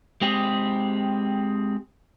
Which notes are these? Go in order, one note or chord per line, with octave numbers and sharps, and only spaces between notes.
G#3 C4 G4 G#4